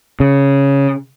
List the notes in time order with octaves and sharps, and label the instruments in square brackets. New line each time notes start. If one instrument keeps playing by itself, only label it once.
[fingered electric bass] C#3